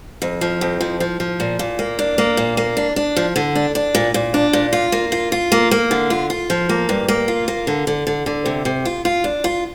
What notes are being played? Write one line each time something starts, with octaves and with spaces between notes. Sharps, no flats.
F2
F3
F2
F3
F3
F3
A#2
A#2
A#3
D4
A#3
A#2
A#3
D4
D4
F3
D3
D4
D4
A#2
A#2
D4
A#2
F4
A#3
F4
F4
A#3
A#3
D3
F4
F4
F3
A#3
G2
A#3
F4
A#3
D3
D3
D3
D3
C3
C3
F4
F4
D4
F4